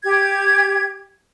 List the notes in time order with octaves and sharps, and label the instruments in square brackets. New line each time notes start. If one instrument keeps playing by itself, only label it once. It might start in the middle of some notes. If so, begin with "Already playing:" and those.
[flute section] G4 G#6